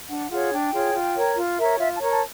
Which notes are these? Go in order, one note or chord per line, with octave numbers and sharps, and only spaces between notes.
D4 F#5
F4 G#4 C#5 F#5
D4 G5
F4 G#4 C#5
F4
A#4 C#5
F4
A#4 C#5 E5
F4 E5
A5
A#4 C#5 A#5
A5